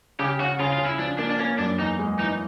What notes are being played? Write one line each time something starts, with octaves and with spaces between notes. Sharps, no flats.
C#3 G4
C#3 F#4
C#3 F4
F4
C#3
E4
F3 D4
A#3 D4
D4
A#3 C#4
F#2 D4
E2 D#4
G#3
E3 D#4